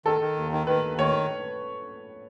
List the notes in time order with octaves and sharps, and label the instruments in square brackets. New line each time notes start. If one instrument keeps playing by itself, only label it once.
[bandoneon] D#3 [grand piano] A4
[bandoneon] D#3
D#2
D#3
[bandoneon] D#3 [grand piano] B4
[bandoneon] D#2
[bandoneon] D#3 [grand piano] C#5